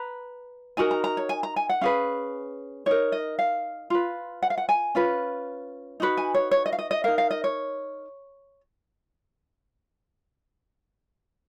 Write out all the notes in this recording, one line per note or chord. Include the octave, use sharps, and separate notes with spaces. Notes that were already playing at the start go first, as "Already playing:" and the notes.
Already playing: B4 A#5
D#4 F#4 A#4 G#5
A#5
A#5
C#5
G#5
A#5
G#5
F#5
C#4 G#4 B4 F5
D#4 A#4 C#5
D#5
F5
F4 B4
F#5
F5
F#5
G#5
C#4 F4 B4
D#4 F#4 B4
G#5
C#5
C#5
D#5
F5
D#5
D#5
D#4 A#4 F5
F5
D#5
C#5